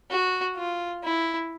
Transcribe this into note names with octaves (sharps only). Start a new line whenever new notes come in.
F#4
F4
E4